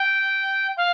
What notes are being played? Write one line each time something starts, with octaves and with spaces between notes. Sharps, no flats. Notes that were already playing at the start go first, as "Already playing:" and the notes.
Already playing: G5
F5